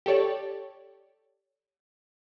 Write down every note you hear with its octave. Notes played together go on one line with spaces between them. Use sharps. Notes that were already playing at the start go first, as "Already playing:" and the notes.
G4 A4 C#5 D5